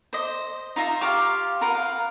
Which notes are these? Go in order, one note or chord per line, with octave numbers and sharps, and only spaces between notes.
C5 D#5
D#4 F4 E5 A#5
F4 G4 F5 C#6
F4 A#4 B4 F#5
F5